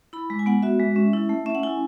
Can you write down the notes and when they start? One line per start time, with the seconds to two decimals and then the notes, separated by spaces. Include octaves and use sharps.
0.13 E4 B5
0.30 G#3
0.39 G#5
0.46 B3 F#5
0.63 F#4 E5
0.80 G#3
0.96 C#4
1.13 E4
1.29 A3
1.46 C#4 E5
1.55 F#5
1.63 E4 G#5